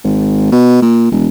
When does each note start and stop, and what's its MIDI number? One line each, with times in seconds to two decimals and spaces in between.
0.04 0.50 32
0.52 0.79 47
0.82 1.08 46
1.11 1.27 28